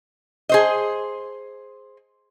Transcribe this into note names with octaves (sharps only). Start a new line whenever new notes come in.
G#4 C5 D#5